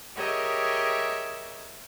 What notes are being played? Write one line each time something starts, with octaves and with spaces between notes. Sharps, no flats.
G4 G#4 A#4 C#5 D#5 E5